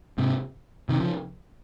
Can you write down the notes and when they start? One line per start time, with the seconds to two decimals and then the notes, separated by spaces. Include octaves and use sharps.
0.18 G#2 C3
0.89 C3 D#3
1.00 C#3 F3